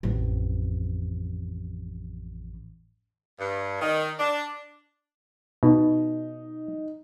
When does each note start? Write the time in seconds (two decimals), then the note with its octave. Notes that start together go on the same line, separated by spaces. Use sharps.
0.03 A1 F2
3.39 G2
3.81 D#3
4.19 D4
5.63 B2 D#4